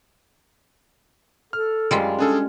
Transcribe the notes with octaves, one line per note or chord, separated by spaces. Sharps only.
A4 F6
F#2 G3 G#3 F4
C#4 D4 G#4 A4